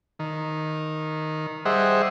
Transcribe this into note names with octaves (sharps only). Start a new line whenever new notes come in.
D#3
G3 G#4 C5 D#5 E5 F#5